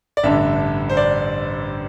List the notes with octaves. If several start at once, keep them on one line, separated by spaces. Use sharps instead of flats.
D5
A1 G2 D3 E5
C5
D5